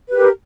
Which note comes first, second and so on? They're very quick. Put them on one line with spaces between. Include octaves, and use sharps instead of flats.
B4 G4 A#4